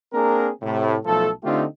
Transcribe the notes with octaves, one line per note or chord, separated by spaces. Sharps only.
A#3 C4 D4 G#4 A#4
A2 C3
B1 F3 A3 A4
D3 A3 C4 D#4 F4 G4